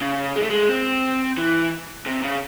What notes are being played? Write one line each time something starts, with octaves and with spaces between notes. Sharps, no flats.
C#3
G#3
A3
G#3
C4
E3
C3
C#3